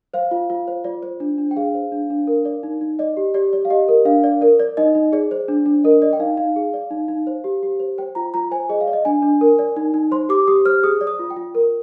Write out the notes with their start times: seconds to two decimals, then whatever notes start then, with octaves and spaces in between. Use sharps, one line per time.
0.14 C5 F5
0.31 F4
0.50 F4
0.67 C5
0.84 F4 D5
1.03 C5
1.20 D4
1.38 D4
1.51 G5
1.56 G#4 F5
1.75 C5
1.92 D4
2.10 D4
2.27 A#4
2.45 D5
2.63 D#4
2.81 D#4
2.99 D5 D#5
3.17 G4
3.34 G4 D5
3.53 D5
3.65 F5
3.70 G4 D#5
3.88 A#4
4.05 D4 F5
4.24 D5
4.41 A#4 D5
4.60 D5
4.77 D#4 D#5
4.95 D#4
5.12 G#4 D5
5.31 C5
5.48 D4
5.66 D4
5.84 A#4 D#5
6.02 D5 D#5
6.13 G5
6.19 D#4 F5
6.37 D#4 F5
6.56 G#4
6.74 D5
6.91 D#4
7.08 D#4
7.27 C5
7.44 G4
7.63 G4
7.80 C5
7.98 C5 G5
8.15 F4 A#5
8.34 F4 A#5
8.51 C5 G#5
8.69 G#4 D#5
8.81 F5
8.88 D5
8.93 D#5
9.05 D4 G#5
9.22 D4
9.41 A#4
9.59 D5
9.76 D#4
9.94 D#4
10.11 C5 C6
10.29 G4 D6
10.47 G4 D#6
10.65 C5 F6
10.83 G#4 D#6
11.01 D5
11.07 D#6
11.19 F4
11.30 G5
11.36 F4
11.55 A#4